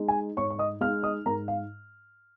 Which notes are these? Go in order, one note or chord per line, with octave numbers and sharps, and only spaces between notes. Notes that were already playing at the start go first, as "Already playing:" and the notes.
Already playing: G#3 D#4
G#5
G#2 C#5 C#6
C#6
D#5 D#6
G#3 D#4 F5 F6
D#5 D#6
G#2 A#4 A#5
F5